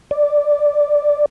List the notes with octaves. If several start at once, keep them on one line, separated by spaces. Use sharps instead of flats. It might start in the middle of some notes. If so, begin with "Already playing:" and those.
D5